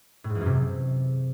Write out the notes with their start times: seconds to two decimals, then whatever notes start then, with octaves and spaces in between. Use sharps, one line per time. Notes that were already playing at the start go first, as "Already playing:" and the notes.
0.24 A2
0.30 G#2
0.35 E2
0.41 F#2
0.46 C3